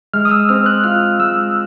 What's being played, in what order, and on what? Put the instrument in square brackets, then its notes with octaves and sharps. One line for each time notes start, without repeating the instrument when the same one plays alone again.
[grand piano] G#3 [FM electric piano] F6
[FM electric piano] D#6
E6
[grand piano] C4 [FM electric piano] F6
[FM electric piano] F#6
[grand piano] F4 [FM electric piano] F6
[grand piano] G#3 [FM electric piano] E6